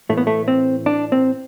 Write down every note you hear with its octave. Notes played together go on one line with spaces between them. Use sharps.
A2 E3 A3
B3
A3
C4
D4
C4